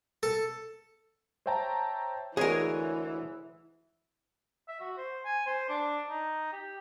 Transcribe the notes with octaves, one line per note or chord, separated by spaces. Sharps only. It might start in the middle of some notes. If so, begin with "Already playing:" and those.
A4
C5 C#5 E5 G5 A5 A#5
D2 E3 G#3 G#4 A#4 C#5 G#5
E5
F#4
C5
G#5
C5
D4
D#4
G4